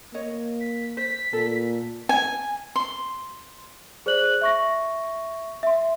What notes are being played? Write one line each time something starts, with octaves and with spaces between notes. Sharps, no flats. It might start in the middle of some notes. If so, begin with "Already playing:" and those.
A#3 C#5 D#5
B6
C5 B6
A#2 A4
G#5
C6
G#4 C5 D5 F#6 F#7
E5 C#6 A#6
E5 C6